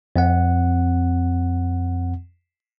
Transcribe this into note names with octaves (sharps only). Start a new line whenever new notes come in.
F2 C4 F#5